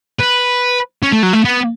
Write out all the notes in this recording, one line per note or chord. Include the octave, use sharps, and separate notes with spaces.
B4
C#4
A3
F#3
A3
B3